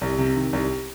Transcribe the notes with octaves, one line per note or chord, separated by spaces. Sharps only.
C2
C3
D#3
C2